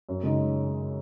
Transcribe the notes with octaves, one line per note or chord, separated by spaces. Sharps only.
F#2
C#3 G#3 D#4